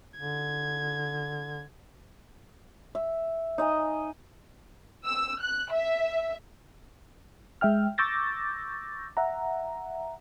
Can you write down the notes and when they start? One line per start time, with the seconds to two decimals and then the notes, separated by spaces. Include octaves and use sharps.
0.19 D3 G#6
2.95 E5
3.58 D#4 D#5 G#5
5.06 E6
5.42 F#6
5.73 E5
7.61 G#3 E5 G5 F6
7.98 C#6 D6 E6 G6 A6 A#6
9.17 E5 F#5 A#5